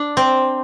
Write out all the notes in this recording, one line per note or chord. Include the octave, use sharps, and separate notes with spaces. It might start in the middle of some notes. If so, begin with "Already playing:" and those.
Already playing: D4
C4